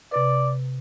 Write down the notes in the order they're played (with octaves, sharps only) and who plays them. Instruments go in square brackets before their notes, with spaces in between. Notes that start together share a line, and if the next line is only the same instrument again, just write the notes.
[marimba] C3 B4 [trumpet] D5